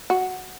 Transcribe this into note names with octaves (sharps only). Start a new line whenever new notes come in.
F#4